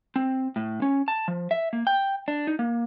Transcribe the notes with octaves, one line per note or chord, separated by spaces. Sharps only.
C4
A2
C#4
A5
F3
E5
A#3
G5
D4
D#4
A#3